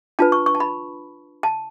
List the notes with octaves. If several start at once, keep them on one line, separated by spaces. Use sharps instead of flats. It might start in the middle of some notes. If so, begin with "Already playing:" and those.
D4 F4 B4 A5
C#6
C#6
A5
B5
A5